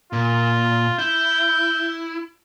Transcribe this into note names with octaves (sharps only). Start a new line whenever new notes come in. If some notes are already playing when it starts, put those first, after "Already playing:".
A#2 F4
E4 G6